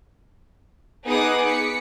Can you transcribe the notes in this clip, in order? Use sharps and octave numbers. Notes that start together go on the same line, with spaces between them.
B3 D#4 G#4 D6 D#6 F#6
B6 C#7